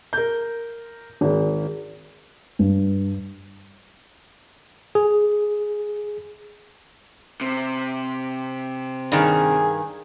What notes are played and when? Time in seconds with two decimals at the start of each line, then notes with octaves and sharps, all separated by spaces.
0.13 A#4 G6
1.21 G#1 G#4
2.59 G2
4.95 G#4
7.41 C3
9.12 G2 D#3 G#4